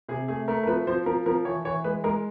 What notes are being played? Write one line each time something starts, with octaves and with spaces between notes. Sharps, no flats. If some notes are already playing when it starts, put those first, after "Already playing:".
C3 G#4
A3 G#4
A3 A#4
A#4
F3 B4
F3 C5
F3 A#4
F3 A#4
E3 C#5
E3 C#5
G#3 B4
G#3 A#4